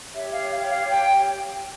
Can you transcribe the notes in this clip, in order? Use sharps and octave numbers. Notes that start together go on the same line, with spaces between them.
G4 C#5 E5
F5
F5
F5
G5